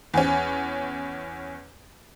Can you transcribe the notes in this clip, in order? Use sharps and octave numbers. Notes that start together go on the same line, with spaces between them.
E2 C#4